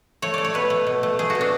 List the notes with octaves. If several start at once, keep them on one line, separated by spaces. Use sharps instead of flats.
A3 C#5
A3 D5
C#5
B2 B4
A3
B2
A3
A3 G#4
F#4
B2
D4